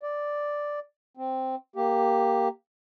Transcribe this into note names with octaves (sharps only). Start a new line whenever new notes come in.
D5
C4
A#3 G4